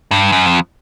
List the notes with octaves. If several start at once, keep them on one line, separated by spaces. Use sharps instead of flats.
G2
F#2
F2